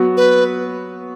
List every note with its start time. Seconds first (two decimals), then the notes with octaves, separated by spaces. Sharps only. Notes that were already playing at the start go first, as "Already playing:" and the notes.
Already playing: F#3 B3 F#4
0.17 B4